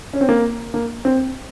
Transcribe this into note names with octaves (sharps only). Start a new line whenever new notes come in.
C#4
C4
A#3
A#3
C4